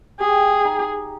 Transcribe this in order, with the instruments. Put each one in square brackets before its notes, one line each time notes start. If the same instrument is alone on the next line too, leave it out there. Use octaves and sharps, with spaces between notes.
[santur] G4 [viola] G#4
[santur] D#4